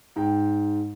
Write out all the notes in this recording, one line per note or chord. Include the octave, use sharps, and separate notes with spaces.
G#2 G5